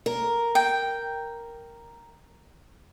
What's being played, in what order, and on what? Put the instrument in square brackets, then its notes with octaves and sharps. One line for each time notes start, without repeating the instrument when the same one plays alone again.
[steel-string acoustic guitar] A#4
[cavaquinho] G5